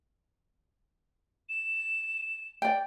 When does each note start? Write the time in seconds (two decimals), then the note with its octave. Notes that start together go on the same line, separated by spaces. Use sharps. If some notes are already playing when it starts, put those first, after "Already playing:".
1.49 E7
2.62 D5 G5